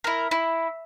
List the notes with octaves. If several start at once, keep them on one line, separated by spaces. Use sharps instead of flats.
E4 A#4
E4